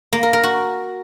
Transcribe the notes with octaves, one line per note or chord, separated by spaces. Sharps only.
A#3
A#4
A#4
F#4